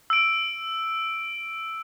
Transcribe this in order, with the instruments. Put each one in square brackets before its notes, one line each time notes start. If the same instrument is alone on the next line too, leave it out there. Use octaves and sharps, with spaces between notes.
[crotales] E6 D7